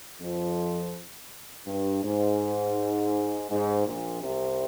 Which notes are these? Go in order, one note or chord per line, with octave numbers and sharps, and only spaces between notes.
F2 F3
G2
G#2
G#2
A#1 A#2
C2 C3